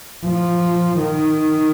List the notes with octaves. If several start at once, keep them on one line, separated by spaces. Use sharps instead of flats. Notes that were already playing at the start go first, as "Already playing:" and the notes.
F3
D#3